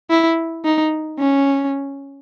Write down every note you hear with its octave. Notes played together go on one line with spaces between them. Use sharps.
E4
D#4
C#4